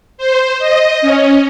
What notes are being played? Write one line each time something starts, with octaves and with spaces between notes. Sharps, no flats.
C5
D#5
C#4